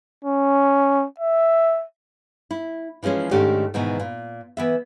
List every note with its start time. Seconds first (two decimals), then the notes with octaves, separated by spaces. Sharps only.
0.24 C#4
1.20 E5
2.51 E4
3.03 E3 F3 G#3 C#4 G#4
3.31 G#2 D#3 A3 C#4 D4 G4
3.74 G#2 B2 D#3 E3
4.00 A#2
4.57 E3 B3 E5